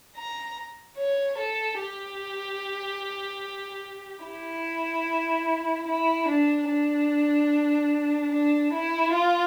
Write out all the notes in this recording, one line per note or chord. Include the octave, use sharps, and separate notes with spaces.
A#5
C#5
A4
G4
E4
E4
D4
D4
D4
E4
F4